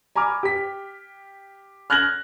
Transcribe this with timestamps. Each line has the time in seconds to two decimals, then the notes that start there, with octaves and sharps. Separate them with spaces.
0.16 G#5 A#5 B5 D6 F6
0.43 G4 B6
1.90 F6 F#6 G#6 A#6 F#7